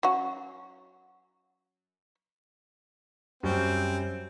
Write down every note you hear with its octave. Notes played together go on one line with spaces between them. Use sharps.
F#3 C#4 F#4
F#2 G3 C4 C#6